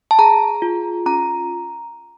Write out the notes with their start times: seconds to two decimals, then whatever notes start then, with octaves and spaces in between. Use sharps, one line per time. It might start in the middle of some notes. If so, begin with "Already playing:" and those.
0.11 A5
0.19 G#4 A#5
0.62 F4
1.06 C#4 A#5